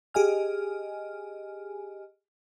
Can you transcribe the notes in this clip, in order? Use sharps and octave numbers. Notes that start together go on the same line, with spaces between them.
G4 G#4 D#5 G#5 F6